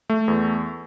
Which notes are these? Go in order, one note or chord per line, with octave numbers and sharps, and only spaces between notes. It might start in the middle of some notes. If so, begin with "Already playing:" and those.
A3
E2